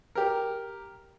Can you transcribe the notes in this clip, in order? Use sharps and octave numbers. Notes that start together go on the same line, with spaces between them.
G4 A#4